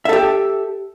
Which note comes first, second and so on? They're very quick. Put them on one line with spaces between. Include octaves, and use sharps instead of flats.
E5 A4 G4